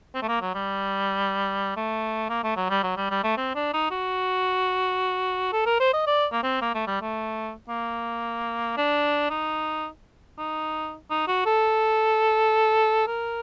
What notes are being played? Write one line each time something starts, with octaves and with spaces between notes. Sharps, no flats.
C4
A3
A#3
F#3
G3
A3
A#3
A3
F#3
G3
F#3
G3
G3
A3
C4
D4
D#4
F#4
A4
A#4
C5
D#5
D5
A#3
C4
A#3
A3
G3
A3
A#3
D4
D#4
D#4
D#4
F#4
A4
A#4